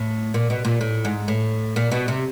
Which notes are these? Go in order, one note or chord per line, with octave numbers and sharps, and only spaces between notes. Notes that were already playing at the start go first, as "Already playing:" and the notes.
Already playing: A2
A#2
B2
A#2
A2
G#2
A2
A#2
B2
C3